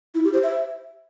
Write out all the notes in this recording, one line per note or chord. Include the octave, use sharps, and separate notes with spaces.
E4
G4
C5
E5